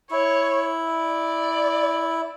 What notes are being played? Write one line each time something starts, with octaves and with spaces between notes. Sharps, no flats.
E4 C#5
D5